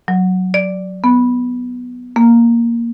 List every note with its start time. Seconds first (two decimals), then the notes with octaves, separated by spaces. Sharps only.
0.08 F#3
0.54 D5
1.04 B3
2.16 A#3